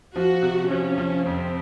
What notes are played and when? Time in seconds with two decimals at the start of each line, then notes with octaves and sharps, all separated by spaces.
0.16 F3 F#4
0.42 C3
0.70 F3 C#4
0.98 F3
1.26 F2 C4